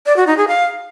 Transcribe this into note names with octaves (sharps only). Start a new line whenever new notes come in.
D5
F#4
D#4
G#4
F5